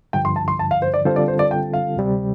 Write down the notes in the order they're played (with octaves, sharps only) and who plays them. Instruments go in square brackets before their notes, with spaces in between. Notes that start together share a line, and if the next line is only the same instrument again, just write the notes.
[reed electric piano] G2 D3 F3 [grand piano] G5
[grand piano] C6
A5
C6
A5
F5
C5
D5
[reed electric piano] D3 G3 C4 F4 A4 [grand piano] C5
[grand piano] D5
C5
D5
G5
F5
[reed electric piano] D2 C3 G3 C4